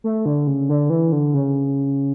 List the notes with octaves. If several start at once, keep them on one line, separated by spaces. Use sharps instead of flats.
A3
D3
C#3
D3
E3
D3
C#3